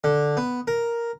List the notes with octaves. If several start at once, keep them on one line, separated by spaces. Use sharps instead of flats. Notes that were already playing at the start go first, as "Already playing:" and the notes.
D3
B3
A#4